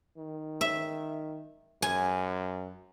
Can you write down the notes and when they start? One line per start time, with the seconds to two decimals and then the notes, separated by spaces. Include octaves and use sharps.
0.17 D#3
0.61 E5
1.82 F#2 G#5